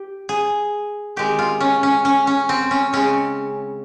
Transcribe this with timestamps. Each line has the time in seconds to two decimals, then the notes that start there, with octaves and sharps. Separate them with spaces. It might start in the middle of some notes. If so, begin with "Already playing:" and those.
Already playing: G4
0.29 G#4
1.16 D#3 G#3 C4 G4
1.39 F4
1.60 C#4
1.83 C#4
2.05 C#4
2.27 C#4
2.49 C4
2.71 C#4
2.93 C#3 G#3 C4 C#4